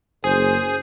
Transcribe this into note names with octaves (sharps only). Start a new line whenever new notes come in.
F#1 G#4 C5